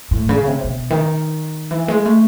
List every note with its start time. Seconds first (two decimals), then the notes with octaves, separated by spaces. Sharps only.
0.11 A2
0.29 C#3
0.47 C3
0.64 B2
0.90 D#3
1.71 E3
1.88 G#3
2.05 A3